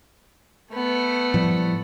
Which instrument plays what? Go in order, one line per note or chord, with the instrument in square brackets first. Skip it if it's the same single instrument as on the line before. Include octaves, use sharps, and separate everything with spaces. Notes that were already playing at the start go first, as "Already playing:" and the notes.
[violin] A3 B3
[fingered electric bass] A2 F3 G3